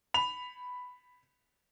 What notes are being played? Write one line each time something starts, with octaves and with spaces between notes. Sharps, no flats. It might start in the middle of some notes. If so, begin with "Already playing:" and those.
B5 F7